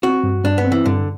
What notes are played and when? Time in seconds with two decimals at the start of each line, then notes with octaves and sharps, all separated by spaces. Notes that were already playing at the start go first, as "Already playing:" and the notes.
0.03 C4 F#4
0.24 G2
0.44 G2 D4
0.58 B3
0.65 C4
0.72 E3
0.85 G2 D3